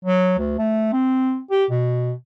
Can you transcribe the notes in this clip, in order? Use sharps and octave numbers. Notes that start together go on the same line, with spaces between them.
F#3
D2
A3
C4
G4
B2